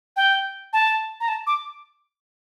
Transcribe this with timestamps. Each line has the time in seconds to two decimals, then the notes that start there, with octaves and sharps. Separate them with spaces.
0.16 G5
0.73 A5
1.20 A#5
1.28 A5
1.47 D6